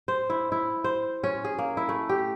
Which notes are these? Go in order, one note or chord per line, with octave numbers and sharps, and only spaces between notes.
C5
E4
E4
C5
C#4
G#4
A#3
E4
A3
G4